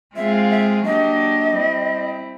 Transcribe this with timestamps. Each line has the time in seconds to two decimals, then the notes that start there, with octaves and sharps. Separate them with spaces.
0.15 G#3 C4 F4 G#4 E5
0.33 F5
0.50 E5
0.85 F#3 A#3 D4 G4 D#5
1.53 G3 C4 E4